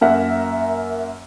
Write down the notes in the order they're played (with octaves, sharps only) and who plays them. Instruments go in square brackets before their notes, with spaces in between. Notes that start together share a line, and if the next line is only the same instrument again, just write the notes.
[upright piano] F#2 A#3 A#4 E5 F#5